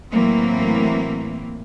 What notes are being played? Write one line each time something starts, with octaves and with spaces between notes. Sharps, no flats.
A2 E3 F#3 A#3 C4